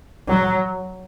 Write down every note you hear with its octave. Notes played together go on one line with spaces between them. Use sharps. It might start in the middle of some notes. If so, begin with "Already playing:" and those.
F#3